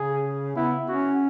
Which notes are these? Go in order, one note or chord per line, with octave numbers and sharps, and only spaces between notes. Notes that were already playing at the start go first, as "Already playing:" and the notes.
Already playing: C#3 G#4
B3 E4
C#4 F#4